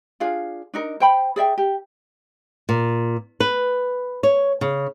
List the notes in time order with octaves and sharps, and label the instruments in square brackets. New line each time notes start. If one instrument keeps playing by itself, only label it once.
[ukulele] D4 F4 G#4 F5
D4 D#4 A#4
C5 G5 B5
G#4 D5 E5 G5
G4
[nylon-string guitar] A#2
B4
C#5
C#3